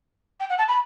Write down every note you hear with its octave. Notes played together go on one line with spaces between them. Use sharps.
G5
F#5
A5
B5